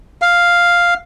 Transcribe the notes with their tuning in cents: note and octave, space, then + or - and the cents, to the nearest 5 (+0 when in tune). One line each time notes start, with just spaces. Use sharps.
F5 +0